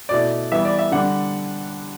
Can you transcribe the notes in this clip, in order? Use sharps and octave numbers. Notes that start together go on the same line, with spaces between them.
B2 A3 E4 D5
E3 G3 B3 E5
D5
E5
D3 G3 D4 F#5